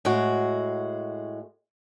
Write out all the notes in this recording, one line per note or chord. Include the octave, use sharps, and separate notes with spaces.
A2 G#3 F#4